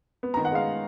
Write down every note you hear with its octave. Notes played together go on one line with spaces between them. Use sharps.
B3
D#3 A#5
F#5
G#3 F5